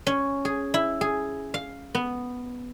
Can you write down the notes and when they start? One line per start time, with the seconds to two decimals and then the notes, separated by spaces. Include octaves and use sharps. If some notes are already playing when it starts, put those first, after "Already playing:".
0.07 C#4
0.45 G#4
0.74 E4
1.01 G#4
1.54 F5
1.95 B3